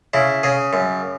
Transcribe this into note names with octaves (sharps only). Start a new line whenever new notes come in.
C#3 E4
C#3 G#4
F#2